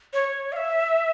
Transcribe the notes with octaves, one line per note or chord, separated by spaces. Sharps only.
C#5
F5
E5